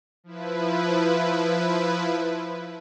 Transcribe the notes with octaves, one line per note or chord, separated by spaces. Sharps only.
F3 E4 B4